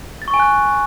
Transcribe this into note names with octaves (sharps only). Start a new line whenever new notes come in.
A6
C#6
G#5
F#6